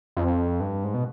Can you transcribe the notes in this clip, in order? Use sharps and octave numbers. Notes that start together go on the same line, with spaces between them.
F2
G2
G#2
B2